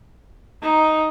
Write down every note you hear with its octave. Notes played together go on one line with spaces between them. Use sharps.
D#4